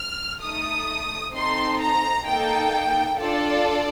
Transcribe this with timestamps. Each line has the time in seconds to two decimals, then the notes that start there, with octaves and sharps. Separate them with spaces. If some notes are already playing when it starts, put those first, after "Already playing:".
Already playing: F6
0.41 A3 D#4 A4 D#6
1.34 C4 D#4 A4 C6
1.81 A#5
2.27 A#3 D#4 A4 G5
3.20 D4 F4 A4 D5